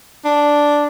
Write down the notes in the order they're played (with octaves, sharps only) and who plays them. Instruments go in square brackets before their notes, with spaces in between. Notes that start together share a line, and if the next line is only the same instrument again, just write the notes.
[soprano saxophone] D4